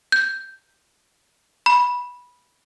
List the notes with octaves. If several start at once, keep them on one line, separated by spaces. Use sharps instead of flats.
G6
B5